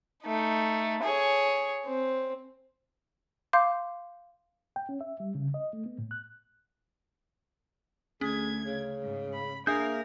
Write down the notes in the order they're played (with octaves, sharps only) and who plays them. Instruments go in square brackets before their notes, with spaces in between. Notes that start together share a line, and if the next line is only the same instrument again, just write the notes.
[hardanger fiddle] A3 D#4
G#4 C#5
C4
[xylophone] F5 C6 D6 G6
[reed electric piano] G5
C#4
E5
G3
C#3
D#5
A3
B3
A2
F#6
[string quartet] D2 G#6 [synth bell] C#4 [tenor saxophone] G#4
[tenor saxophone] C#3
[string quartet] G#2
B5
[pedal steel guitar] A#3 E5 G6 [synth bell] D4 [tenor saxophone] G#4 [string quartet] A#4